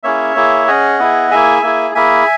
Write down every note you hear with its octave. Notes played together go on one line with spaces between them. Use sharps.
A#3 C#4 E4 G#4 C#5 E5
A#3 E4 G#4
C#4 G#4 D#5 F#5
B3 E4 G#4
A#3 E4 G#4 E5 G#5
A#3 E4 G#4
A#3 E4 G#4 E5 G#5